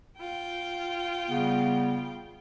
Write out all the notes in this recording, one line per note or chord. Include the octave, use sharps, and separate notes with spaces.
F4 G5
C#3 G3 B3